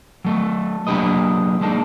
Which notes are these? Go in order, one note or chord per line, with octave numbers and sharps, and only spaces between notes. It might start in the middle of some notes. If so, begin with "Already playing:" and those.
F#3 A3
F#3 A#3 D4 G4 B4 D#5
G#3 A#3 D4 D#4